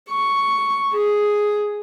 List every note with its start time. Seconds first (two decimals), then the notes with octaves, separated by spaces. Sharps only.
0.10 C#6
0.93 G#4